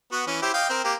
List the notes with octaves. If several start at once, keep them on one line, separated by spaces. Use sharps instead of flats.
B3 F#4
E3 C#4
E4 G4 C5
D#5 F5 G5
C4 A#4
A#3 G4